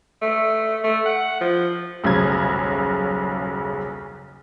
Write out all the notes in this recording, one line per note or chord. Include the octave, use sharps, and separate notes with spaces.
A3
A3
F#5
F3
D#1 B1 F#2 C#3 G#6